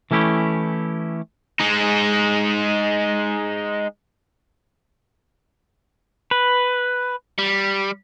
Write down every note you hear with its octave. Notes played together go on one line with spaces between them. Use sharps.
E3 A3 C#4 E4 G4
G#3 D#4
B4
G3